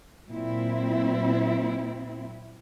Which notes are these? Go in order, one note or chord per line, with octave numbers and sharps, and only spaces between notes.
A#2 F#3 C4 E4